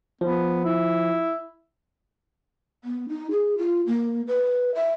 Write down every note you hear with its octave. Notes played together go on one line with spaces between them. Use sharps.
F3 B3
E4
B3
D#4
G#4
F4
A#3
B4
E5